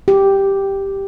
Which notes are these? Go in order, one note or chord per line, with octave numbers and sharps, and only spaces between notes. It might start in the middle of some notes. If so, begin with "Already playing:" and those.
G4